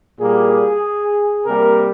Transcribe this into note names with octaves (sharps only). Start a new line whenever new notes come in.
A#2 G3 A#3 G#4
C3 G3 A#3 A#4